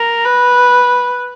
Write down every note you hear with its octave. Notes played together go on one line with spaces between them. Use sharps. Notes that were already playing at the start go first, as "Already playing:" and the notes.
Already playing: A#4
B4